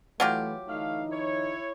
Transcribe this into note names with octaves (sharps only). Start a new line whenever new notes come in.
E3 F#3 A3 F4 G4
D3 E3 A3 D#4 F5
E4 C#5